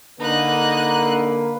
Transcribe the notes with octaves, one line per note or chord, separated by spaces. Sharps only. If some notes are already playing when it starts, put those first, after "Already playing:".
D3 A#3 D#4 B4 F#6